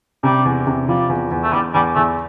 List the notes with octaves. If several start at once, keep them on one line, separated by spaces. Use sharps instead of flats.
C3 G3
E2
C3
F3 G3
E2
E2
A3
E2 G3
E2 G3
E2 A3